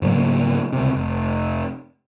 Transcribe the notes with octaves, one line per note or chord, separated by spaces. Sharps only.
G#2 C#3 F#3 A#3
C#2 C3
F1